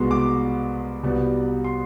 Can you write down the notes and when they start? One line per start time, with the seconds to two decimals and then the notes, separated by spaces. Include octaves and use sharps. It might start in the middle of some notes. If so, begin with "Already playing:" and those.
Already playing: C2 B2 G#3 B3 C6
0.11 D6
1.03 C2 B2 G3 B3
1.64 C6